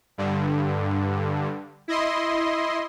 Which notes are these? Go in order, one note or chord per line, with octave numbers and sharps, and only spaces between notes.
G2 D3
E4 D#5 C6